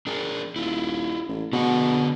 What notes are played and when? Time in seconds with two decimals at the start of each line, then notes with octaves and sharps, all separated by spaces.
0.07 D4 G#4 A#4
0.56 D#1 E4 F4
1.28 A1
1.53 B2 D3 G#4 F#5